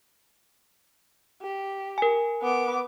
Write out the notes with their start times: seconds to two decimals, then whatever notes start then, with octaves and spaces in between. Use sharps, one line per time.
1.42 G4
1.98 A#4 G#5
2.42 B3 D6